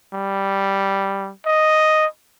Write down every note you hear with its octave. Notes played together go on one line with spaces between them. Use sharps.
G3
D#5